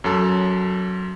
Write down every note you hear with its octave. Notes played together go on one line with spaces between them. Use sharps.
F#2 F#3 A4